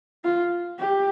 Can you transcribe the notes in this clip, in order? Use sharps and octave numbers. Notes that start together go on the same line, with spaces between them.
F4
G4